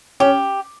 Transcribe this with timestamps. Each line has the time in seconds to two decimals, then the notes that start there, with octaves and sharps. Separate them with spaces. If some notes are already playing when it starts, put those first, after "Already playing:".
0.20 C#4 G4